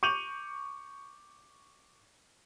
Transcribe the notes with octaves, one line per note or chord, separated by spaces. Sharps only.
C#6 D6 G6 D#7 F7 F#7